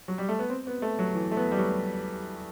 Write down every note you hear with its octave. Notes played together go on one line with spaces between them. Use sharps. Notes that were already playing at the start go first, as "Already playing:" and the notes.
F#3
G3
A3
B3
C4
B3
A3
F#3
E3
A3
B3
G3
F#3